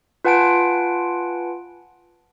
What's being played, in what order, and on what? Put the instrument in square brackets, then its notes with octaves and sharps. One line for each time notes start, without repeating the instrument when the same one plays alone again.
[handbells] F4 B4 F#5 G#5 A5 D7